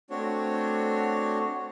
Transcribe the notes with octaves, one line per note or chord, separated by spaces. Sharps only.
A3 C4 D4 F#4 C#5